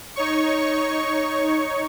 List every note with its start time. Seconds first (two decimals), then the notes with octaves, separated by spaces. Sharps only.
0.16 D#4 C#5 C#6